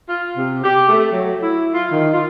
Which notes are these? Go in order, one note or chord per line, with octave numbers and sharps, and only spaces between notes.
F4
C3
G4
A3
F#3
E4
F4
D#3
F4